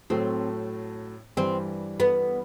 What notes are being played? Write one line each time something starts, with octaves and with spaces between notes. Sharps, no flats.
A2 F#3 A3 C4
G2 E3 G3 C4
B3